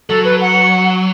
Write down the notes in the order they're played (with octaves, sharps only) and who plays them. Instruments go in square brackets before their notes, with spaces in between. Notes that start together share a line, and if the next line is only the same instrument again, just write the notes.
[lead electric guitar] F#3 [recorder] A4
[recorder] B4
F#5